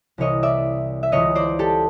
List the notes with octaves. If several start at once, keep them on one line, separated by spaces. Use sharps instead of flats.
C2 C3 E3 C#5 D#5
D5 E5
E5
C#2 C#3 E3 C#5 D#5
C5 D5
G4 A4